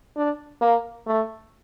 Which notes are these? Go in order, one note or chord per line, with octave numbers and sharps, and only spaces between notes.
D4
A#3
A3